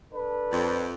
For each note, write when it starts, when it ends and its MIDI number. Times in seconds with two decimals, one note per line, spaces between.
0.14 0.89 62
0.14 0.89 69
0.14 0.89 71
0.52 0.95 41